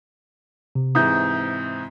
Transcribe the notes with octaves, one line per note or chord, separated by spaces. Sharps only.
C3
G#2 C3 E3 D#6 G6